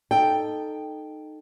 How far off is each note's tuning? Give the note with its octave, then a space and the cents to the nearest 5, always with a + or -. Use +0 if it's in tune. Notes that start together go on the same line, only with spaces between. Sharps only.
D#4 -15 A4 +0 G5 +0